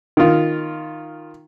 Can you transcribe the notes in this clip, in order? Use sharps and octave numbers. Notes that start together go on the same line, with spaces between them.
D#3 F4